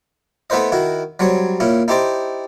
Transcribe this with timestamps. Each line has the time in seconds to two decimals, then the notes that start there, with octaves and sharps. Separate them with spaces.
0.50 A3 B3 E4 B4 C5 D#5
0.72 D#3 E4 F#4
1.19 F#3 G3 C4 C#5
1.60 A#2 C#4 E4
1.88 D#4 E4 G4 C5 D5 D#5